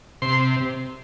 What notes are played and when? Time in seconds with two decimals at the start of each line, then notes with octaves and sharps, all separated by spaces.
0.22 C3 C6